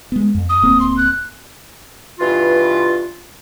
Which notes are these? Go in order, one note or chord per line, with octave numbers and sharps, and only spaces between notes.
G#3 B3
F2
D#6
D1 A#3 C4
C6
F#6
G2 B2 E3 F4